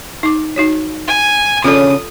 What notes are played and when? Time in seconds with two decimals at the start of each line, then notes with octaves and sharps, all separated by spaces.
0.23 D#4 D6
0.56 D#4 F#4 C#5
1.08 G#5
1.64 C#3 C#4 D4 F4 A4 D#6